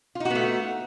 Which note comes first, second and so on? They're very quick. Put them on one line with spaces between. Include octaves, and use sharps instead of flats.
F4 D#4 F#4 B3 A3